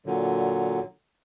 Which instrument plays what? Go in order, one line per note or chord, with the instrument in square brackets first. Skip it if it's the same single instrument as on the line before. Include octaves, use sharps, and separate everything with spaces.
[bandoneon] A#2 D3 F#3